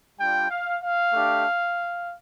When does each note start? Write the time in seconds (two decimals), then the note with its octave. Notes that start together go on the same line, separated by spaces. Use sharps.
0.20 G3 D4 F4 G5
0.50 F5
0.82 F5
1.13 A3 D4 G4